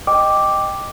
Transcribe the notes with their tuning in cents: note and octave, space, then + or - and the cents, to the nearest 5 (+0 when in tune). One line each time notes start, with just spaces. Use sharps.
D#5 -10 G5 +0 D6 +0